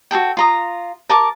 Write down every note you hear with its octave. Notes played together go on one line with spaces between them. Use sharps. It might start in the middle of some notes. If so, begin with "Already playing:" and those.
F#4 G#4 A4 G5
F4 A#5 D#6
A#4 A5 D6